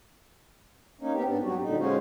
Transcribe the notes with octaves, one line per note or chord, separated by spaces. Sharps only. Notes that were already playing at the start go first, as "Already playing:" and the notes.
A#3 C#4 D#4
B3 C4 G4
G#2 B3 D4
F#3 G3 F#4
A#2 D3 D#4
G#3 C#4 F4 F#4 C5